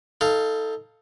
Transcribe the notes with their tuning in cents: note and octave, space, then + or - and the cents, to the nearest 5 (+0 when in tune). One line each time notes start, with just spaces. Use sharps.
D#4 +30 A4 +5 F5 +0